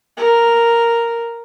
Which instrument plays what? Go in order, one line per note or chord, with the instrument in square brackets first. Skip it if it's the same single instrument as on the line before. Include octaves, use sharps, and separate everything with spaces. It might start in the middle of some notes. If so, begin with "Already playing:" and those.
[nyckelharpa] A#4